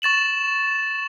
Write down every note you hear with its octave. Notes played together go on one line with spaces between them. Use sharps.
C#6 A6 E7 F#7